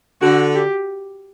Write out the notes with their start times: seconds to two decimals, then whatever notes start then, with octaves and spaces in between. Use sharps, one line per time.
0.21 D3 F#4
0.55 G4